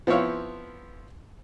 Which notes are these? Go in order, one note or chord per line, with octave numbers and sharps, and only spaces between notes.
F3 B3 C4 E4 C#5 F5